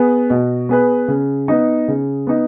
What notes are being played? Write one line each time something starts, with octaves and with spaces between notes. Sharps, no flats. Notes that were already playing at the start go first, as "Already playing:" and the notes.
Already playing: B3 G#4 B4
B2
B3 G#4 B4
C#3
B3 D#4
C#3
B3 D#4